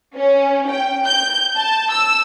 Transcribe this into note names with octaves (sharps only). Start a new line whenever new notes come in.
C#4
G5
G6
A5
E6